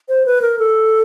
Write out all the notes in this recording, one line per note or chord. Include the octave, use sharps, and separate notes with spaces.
C5
B4
A#4
A4